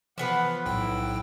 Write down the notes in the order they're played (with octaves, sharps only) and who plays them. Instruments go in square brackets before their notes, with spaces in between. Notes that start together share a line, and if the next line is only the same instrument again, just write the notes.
[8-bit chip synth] E3 [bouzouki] F3 B3 B4 [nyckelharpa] F#5
[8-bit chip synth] B1 A2 G5 [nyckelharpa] E4